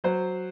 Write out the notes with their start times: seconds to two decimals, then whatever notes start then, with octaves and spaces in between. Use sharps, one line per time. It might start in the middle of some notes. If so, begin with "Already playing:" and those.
0.04 F#3 C5